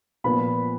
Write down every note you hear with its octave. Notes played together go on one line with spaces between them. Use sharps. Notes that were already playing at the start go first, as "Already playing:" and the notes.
A#2 F3 B3 B5